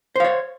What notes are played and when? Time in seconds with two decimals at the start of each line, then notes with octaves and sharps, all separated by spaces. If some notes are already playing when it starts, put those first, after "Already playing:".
0.16 C5
0.20 F5
0.24 C#5